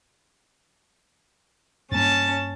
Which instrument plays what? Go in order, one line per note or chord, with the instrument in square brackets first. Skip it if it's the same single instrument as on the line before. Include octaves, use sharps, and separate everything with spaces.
[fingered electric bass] G2 A#3 [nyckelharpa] C#4 A5